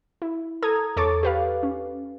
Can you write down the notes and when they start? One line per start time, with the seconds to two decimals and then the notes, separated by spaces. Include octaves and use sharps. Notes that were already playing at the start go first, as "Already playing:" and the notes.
0.22 E4
0.62 A4 A#5 D#6 G#6
0.97 E2 A4 C#5 C#6 D6 A6
1.23 G4 B4 F5
1.63 C#4